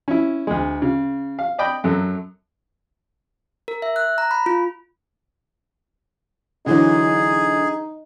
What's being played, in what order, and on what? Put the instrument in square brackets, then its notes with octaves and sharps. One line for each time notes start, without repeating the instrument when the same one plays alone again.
[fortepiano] C#4 E4
D2 G#3
C#3
F5
D5 D#5 G5 B5
F#2 F#3 A4
[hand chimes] A#4
E5
F#6
A#5
B5
F4
[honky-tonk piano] D3 E3 F#3 [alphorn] D#4 [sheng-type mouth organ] G#4